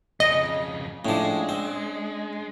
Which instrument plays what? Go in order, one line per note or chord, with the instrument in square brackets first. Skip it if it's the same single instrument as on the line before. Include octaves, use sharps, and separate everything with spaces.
[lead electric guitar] F2 C#3 [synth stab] D#5
[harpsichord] A2 F3 [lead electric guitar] G#3 [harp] C#4 D4
[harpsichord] C4